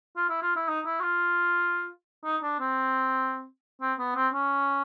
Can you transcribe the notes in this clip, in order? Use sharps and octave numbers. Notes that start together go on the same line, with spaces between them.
F4
E4
F4
E4
D#4
E4
F#4
F4
D#4
D4
C4
C4
B3
C4
C#4